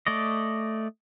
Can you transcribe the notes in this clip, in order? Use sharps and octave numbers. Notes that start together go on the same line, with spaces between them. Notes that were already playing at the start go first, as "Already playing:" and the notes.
A3 D5 D#5